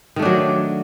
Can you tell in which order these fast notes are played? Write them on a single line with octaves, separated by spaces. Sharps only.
D#3 A3 D4 F#3